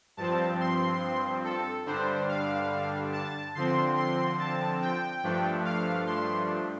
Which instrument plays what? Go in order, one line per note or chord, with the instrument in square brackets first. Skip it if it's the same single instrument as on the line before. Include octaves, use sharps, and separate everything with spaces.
[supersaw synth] G2 F3 C4 A5
C6
A4
G2 D3 G3 D4 C5
F5
A5
D3 F3 C4 C6
C6
A5
G5
G2 F3 A3 D4
F5
C6